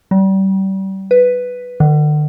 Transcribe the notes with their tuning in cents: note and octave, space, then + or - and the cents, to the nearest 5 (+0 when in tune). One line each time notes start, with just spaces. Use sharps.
G3 -30
B4 +5
D3 +40